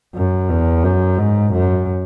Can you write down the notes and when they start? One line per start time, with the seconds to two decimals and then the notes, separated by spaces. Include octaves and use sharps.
0.15 F#2
0.49 E2
0.84 F#2
1.18 G#2
1.52 F#2